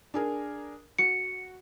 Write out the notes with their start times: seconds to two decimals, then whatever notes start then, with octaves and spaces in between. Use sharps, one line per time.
0.14 D4 G#4 A#4
0.99 F#4 C#7